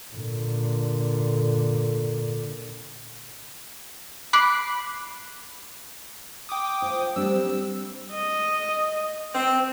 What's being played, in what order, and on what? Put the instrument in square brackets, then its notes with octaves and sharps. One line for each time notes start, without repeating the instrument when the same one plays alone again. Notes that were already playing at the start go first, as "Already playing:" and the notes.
[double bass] A#2 D3
[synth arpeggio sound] B5 D6 F#6 C7
[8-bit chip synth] G5 D6 D#6
[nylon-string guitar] F4 [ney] C5
[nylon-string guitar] G3 C4 D4 [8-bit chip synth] E6
[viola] D#5
[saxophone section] C4